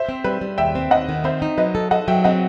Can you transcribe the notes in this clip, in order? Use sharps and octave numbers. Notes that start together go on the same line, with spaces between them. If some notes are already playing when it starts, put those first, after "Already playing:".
Already playing: C5 E5
C4
G3 B4
G3
D#2 E5 G5
C4
D#2 D#5 F#5
D#3
C4 C5 E5
D#4
F#3 B4 D#5
A4
A4 D#5 F#5
F#3 E5 G5
C4 D#5 F#5